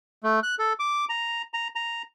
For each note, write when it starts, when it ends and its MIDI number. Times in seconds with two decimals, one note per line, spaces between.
0.23 0.40 57
0.43 0.55 90
0.59 0.73 69
0.79 1.05 86
1.09 1.42 82
1.54 1.68 82
1.75 2.03 82